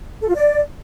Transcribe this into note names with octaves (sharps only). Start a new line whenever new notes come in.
A4
F4
D5